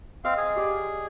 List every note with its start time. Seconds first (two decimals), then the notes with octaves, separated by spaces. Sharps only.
0.24 C4 D#5 F5
0.37 G#4
0.56 G4 D5